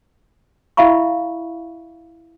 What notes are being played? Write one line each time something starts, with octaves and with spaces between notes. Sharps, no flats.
E4 E5 F5 B5 C#6